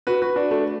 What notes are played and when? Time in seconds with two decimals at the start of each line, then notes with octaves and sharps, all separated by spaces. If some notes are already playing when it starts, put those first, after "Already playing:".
0.07 F#4 B4
0.22 F#4 B4
0.36 D4 F#4
0.51 A3 D4